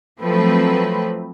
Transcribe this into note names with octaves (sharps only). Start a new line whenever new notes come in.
F3 F#3 A3 C4 B4